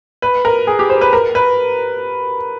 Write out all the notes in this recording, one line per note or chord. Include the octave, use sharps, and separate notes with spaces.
B4
A#4
G#4
G4
C5
B4
A#4
B4